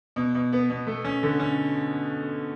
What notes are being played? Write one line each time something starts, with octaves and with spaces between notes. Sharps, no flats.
B2
B2
B3
B2
A3
C#4
D3
C#4